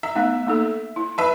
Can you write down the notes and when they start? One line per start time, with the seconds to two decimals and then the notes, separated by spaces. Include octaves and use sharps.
0.03 E5 A#5
0.15 A3 B3 D#4
0.47 A#3 D#4 A4
0.96 E4
1.18 B4 E5 A5